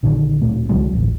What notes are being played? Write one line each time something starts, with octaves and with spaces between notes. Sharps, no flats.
A#1 A#2 D3 D#3
D1 A#2 A3
C2 D3 F#3 G#3
D#1 A1 D2